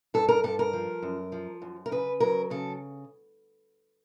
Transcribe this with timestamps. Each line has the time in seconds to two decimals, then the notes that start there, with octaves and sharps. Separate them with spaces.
0.14 G2 A4
0.29 A#4
0.44 G2 A4
0.59 A#4
0.73 F3
1.02 F#2
1.32 F3
1.62 F#2
1.86 A#4
1.91 C#3 B4
2.20 F#3 A#4
2.50 C#3 A4